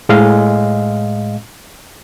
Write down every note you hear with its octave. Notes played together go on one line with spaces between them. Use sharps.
A2 G#3 D#5 F5